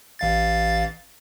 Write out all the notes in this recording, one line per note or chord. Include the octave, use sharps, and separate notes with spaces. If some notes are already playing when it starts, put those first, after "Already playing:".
A1 F5 A6